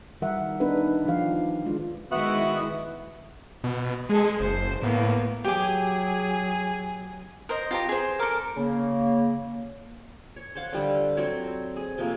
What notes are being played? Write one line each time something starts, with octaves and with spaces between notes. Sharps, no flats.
D#3 G3 A#4 E5 F#5
B3 D4 D#4 A#4 B4
D#3 F3 D4 G4 F5
G#3 D4 F4
D#3 G#3 B3 E4 F#4 E5
B2
G#3 G#4 A4
F#1 C5
A2 A#3 B3
F#3 G4 G#4 D6
A#4 C5 D#5
F4 G4 A#5
G#4 C5
A4 A#4 D6
C#3 A#3
C#5
C5 C#5 F5 F#5
D3 G3 E5
F#3 C4 C#5
G#4
C3 F3 A3 A#3